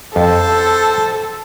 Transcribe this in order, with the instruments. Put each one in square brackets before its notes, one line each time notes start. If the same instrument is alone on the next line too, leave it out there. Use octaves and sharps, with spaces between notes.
[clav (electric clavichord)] F2 [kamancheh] A4 [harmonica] C5 A5